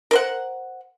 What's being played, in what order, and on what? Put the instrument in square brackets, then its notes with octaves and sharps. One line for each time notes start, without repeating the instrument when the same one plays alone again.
[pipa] A#4 C5 F#5